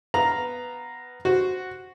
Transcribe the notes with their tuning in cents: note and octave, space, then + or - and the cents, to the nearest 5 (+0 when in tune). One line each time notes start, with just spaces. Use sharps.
B3 +5 F5 +0 A#5 +0
F#4 +0 C5 +0